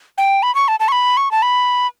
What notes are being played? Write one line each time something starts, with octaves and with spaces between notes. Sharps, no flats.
G5
B5
C#6
A5
A5
C#6
B5
C#6
A5
B5